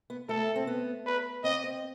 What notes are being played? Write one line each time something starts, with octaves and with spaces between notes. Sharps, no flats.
B3
A3 A4
C4
B3
B4
C4 D#5
C4